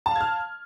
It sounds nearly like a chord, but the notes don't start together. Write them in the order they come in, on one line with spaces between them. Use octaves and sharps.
A5 F5 G#6 F6